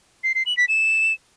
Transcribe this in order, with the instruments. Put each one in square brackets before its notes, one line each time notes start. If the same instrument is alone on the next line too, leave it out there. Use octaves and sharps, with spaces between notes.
[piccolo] C7
C7
F#7
B6
E7